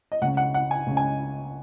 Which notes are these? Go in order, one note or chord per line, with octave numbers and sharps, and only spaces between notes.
D#5
C#2 C#3 F#5
F#5
F#5
G#5
C#2 C#3
G#5